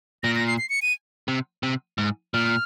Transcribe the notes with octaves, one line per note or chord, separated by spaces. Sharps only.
A#2 A#6
A#6
C7
C7
C#7
D#7
C3
C3
G#2
A#2 F6